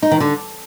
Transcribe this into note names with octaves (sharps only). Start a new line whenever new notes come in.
D#4
D#3
D3